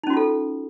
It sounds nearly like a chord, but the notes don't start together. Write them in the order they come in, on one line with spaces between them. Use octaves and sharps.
D#4 C#4 F#4 F4 A4